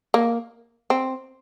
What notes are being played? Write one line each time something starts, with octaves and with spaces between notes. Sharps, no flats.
A#3
C4